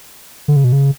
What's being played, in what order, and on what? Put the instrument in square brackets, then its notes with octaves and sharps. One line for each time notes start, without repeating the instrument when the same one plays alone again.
[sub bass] D3
C#3
B2
C#3